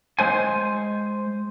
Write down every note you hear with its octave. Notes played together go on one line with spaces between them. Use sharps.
G#3 C5 G#5